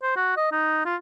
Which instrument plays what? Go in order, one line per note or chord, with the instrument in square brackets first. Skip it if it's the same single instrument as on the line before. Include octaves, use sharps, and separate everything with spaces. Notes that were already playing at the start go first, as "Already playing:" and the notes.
[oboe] C5
F#4
D#5
D#4
F4